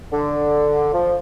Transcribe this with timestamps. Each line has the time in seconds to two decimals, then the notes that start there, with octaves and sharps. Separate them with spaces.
0.12 D3
0.94 F3